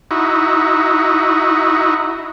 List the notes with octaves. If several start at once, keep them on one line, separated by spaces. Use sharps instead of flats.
D#4 E4 F#4